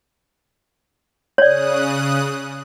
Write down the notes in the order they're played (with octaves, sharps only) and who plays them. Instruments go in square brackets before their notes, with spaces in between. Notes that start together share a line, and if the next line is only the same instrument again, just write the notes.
[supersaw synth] C#3 D#6 F#6 [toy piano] C#5 D5